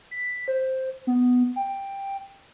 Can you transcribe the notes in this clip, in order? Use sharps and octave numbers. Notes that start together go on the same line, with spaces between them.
B6
C5
B3
G5